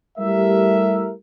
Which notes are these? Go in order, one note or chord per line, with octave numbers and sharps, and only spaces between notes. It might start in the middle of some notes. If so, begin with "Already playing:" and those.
G3 A3 E4 G4 A#4 E5